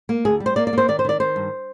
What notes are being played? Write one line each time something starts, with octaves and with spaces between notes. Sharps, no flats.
A#3
D2 G#4
G3
C5
A#3 D5
D5
A#3 C5
D#3 D5
C5
D#3 D5
D#3 C5
G2